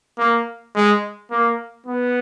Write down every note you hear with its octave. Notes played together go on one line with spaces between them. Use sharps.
A#3
G#3
A#3
B3